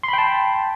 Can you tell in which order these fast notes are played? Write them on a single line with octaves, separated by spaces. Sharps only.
C6 B5 G5 A5